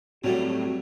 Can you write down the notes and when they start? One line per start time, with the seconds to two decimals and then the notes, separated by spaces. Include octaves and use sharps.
0.24 A2 F#3 G3 A3 C4 F#4